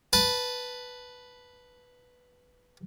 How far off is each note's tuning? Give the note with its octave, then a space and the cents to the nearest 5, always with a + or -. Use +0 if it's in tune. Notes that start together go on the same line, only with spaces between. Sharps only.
B4 +0 A5 +0